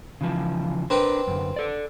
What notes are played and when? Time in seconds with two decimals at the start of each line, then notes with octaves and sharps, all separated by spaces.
0.21 C#3 E3 F3
0.90 C4 D4 A#4 B4 G5
1.27 F#2 D3
1.56 A4 D5